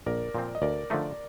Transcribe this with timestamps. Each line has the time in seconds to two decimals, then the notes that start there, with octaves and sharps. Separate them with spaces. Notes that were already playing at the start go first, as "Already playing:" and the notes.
0.06 A#1 A#4 D5
0.35 A#2 F3 C4
0.55 D#5
0.62 D2 A#4 D5
0.90 D3 F3 A3 D#4